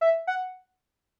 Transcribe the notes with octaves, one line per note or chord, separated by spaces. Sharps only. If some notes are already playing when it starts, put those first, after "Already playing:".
E5
F#5